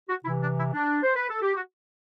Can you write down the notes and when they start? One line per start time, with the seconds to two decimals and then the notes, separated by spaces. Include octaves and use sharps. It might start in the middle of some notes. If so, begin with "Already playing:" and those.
0.08 F#4
0.24 C3 E4
0.28 E3
0.41 D4
0.57 E4
0.74 D4
1.03 C5
1.16 B4
1.29 A4
1.41 G4
1.54 F#4